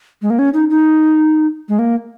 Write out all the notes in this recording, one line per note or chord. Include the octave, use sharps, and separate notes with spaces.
G#3
A#3
C#4
D#4
D#4
G#3
A#3